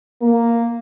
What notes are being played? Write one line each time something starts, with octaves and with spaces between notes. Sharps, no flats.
A#3